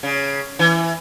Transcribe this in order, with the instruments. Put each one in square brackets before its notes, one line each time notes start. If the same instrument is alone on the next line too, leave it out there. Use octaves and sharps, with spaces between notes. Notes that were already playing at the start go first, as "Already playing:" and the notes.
[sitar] C#3
E3